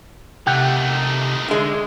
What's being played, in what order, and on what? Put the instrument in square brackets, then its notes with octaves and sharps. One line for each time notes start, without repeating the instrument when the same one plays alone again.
[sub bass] C3 [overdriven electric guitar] D#3 A3 [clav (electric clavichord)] G4 F#5 G5
[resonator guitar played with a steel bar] D3 G#3